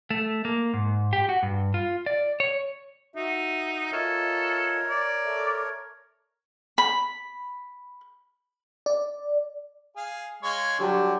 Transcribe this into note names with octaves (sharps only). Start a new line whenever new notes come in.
A3
A#3
G#2
G4
F#4
G2
F4
D5
C#5
D#4 F#4 E5
F4 A4 A#4 C#5 D#5 E5
D5
A4 E5
B5
D5
G#4 F5
G#3 C#5 F5
D3 F#3 G3 D4 G4